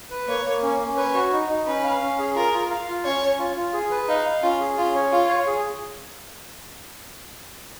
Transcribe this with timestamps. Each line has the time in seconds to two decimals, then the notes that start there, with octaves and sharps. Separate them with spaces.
0.11 B4
0.28 A#3 C#5
0.45 A#3
0.63 C#4
0.80 C#4
0.97 B4 C#5
1.14 F#4
1.33 D#4
1.49 D#4
1.67 C#4 B4
1.84 F5
2.01 C#4
2.19 G#4
2.36 F4 A#4
2.53 F4
2.70 F5
2.88 F4
3.05 C#4 C#5
3.22 C#4
3.39 F4
3.56 F4
3.74 G#4
3.91 B4
4.09 D#4 F5
4.25 F5
4.43 C#4 F4
4.60 G#4
4.78 C#4 F4
4.95 C#5
5.12 F4 F5
5.29 C#5
5.47 G#4